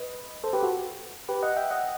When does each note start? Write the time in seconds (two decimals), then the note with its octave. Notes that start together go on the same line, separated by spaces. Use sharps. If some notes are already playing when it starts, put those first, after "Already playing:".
Already playing: B4 D#5
0.44 A4 C5
0.53 G4 B4
0.63 F#4 A4
1.29 G4 B4
1.42 D#5 F#5
1.56 E5 G5
1.70 D#5 F#5